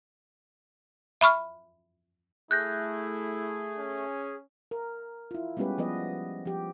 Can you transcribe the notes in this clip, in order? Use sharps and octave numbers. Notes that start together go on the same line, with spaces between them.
E5 B5 C#6 F6
A3 E4 G#4 F#6 G6 A#6
C#4
A#4
E4 F4
G3 G#3 B3 C#4 G4 B4
F3 B3 B4 D#5
F3 G4